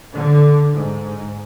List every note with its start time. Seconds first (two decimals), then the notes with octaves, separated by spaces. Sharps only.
0.14 D3
0.75 G#2